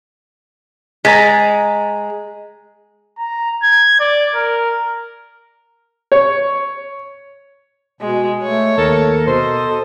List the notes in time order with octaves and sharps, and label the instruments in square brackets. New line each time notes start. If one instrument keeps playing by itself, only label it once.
[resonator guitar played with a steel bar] G#3 [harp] A#5 A6 B6
[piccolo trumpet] A#5
G#6
D5
A#4
[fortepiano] C#5
[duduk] B2 [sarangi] G#3
[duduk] A3 [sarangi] C#5
[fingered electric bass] D#2 [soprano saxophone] A4 [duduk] A#4
[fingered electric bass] B2 [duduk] A4 [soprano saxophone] C5 [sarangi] D#5